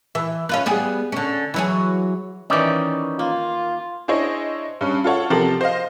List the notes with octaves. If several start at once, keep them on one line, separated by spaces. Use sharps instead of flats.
E3
C#4 F4 B4
G3 B3 G#4
D3 C#4
E3 F#3 G#4
D#3 E3 C#4 D#4 D5
A#3 F4
D4 E4 G#4 C5 C#5 D#5
G2 C#4
F4 A4 C#5 F#5
C3 F3 G4 A4 A#4 F#7
C5 D#5 F5